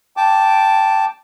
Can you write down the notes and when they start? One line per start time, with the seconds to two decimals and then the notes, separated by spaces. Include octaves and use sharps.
0.17 G5 A5 D6